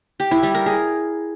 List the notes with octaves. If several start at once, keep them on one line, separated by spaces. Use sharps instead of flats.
G4
E4
G3
A#4
G#4